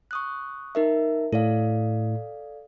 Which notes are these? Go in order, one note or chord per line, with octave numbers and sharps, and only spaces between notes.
C#6 D#6 F#6
D#4 A#4 E5
A2 A4 D5 F5